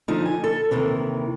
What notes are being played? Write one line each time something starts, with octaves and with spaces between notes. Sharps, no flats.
D3 F3 D#4
G#5
A4
D#2 C3 D#3 E3